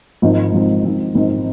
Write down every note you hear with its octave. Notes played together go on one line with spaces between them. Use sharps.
G#1 G#2 F3 C4 D#4
G#1 G#2 F3 C4 D#4
G#1 G#2 F3 C4 D#4
G#1 G#2 F3 C4 D#4